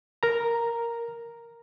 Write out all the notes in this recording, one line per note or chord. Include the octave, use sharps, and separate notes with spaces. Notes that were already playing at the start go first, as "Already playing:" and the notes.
A#4 A#5